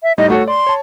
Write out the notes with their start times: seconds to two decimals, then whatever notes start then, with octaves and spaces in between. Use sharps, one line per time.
0.03 E5
0.18 A2 G3 D#4 D#5
0.30 A3 F#4 A4 C#5
0.48 D5 C6
0.67 C#5 A5